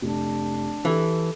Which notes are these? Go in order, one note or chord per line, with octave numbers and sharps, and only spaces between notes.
F1 D4
E3 G4 A4